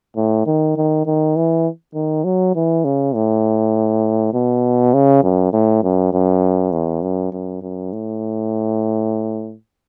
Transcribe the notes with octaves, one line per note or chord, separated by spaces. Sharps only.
A2
D#3
D#3
D#3
E3
D#3
F#3
E3
C#3
A2
B2
C#3
F#2
A2
F#2
F#2
E2
F#2
F#2
F#2
A2